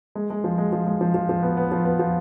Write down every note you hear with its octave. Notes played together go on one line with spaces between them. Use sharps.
G#3
G#3
F3
G#3
F3
G#3
F3
F3
F3
B3
B3
F3
B3
F3